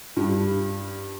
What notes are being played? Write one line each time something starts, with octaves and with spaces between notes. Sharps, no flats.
G2